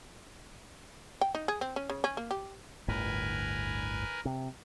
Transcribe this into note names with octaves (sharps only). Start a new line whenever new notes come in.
G5
D#4
G#4
C4
C#4
C#3
C#4
A#3
G4
G1 D2 A2 A#4 B4 G#5
C3